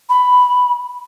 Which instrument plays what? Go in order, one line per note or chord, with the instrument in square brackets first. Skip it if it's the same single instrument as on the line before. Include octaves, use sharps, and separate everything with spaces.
[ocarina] B5